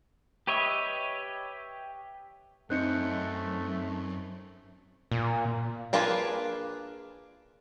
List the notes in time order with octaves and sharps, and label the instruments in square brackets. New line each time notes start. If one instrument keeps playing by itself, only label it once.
[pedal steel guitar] G4 B4 C#5 D#5 E5
[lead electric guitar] F#2 [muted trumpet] A3 [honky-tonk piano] C4 D#4 [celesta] F#6 G6 C#7
[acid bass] A#2
[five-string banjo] A#3 D4 F4 G#4 B4